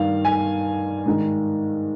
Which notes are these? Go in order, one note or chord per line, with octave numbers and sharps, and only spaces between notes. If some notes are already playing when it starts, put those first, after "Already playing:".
Already playing: G2 D#3 F5
G#5
G#2 D#3